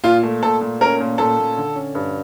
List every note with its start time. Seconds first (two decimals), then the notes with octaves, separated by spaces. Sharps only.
0.04 A#2 F4
0.23 A3
0.43 A#2 A4
0.61 A#2
0.81 C#4 A#4
1.00 A#2
1.18 A#2 A4
1.38 A#2
1.57 D3
1.76 C#4
1.95 G2